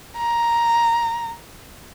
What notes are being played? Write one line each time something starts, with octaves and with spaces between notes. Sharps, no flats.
A#5